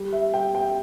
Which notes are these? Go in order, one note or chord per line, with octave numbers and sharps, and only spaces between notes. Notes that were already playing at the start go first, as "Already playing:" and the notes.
Already playing: G3
E5
G3 G5
G5